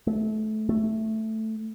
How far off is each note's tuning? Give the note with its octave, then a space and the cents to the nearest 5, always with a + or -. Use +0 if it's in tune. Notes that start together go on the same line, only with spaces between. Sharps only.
A3 -25
A3 +0